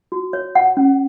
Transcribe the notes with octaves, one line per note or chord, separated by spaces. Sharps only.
F#4
C#5
F#5
C#4